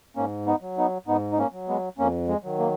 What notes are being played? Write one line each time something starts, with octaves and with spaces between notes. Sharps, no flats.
G#2 A#3 C#4
B3 D#4
F#3
B3 D#4
G#2 B3 D#4
D#4
A#3 C#4
F#3
G#3 B3
F2 A#3 C#4
G#3
D#3 F#3
A#3